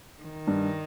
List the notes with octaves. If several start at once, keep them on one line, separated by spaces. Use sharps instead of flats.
D#3
G2